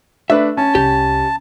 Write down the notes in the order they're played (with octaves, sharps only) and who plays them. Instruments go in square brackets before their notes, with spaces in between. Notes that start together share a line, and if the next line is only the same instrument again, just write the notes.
[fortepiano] A3 D4 B4 [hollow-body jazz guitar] E5
[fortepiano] C#4 [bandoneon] A5
[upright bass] C2 [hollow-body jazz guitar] G4